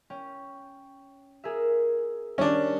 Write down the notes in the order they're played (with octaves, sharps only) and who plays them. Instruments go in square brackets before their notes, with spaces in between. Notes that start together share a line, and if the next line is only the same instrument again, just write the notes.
[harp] C#4 G5
G#4 A#4 E5
[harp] D#3 G3 [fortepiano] C#4 D4